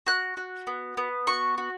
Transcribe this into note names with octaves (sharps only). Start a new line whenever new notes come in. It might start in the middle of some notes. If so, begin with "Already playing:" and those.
F#4 F#6
F#4
B3
B3
F#4 C#6
F#4